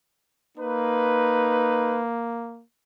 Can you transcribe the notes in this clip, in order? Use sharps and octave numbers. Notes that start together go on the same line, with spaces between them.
A#3 D#4 B4